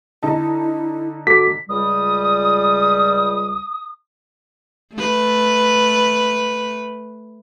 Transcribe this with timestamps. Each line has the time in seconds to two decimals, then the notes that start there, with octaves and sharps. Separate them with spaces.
0.23 D3 D#4 E4 A5
1.27 F#4 A4 D6 B6
1.69 C#2 G3 D#6
4.94 A3 B4